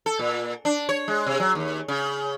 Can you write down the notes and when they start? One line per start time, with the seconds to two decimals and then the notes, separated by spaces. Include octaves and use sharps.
0.06 A4
0.19 A#2
0.65 D4
0.89 C#5
1.08 G#3
1.27 C3
1.40 F#3
1.55 D#2
1.88 C#3